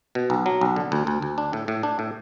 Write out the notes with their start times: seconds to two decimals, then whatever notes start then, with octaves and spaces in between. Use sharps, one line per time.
0.15 B2
0.30 B1
0.46 F#3
0.61 B1
0.76 D3
0.92 D2
1.07 D2
1.22 D2
1.38 D4
1.53 A2
1.68 A2
1.83 D4
1.99 A2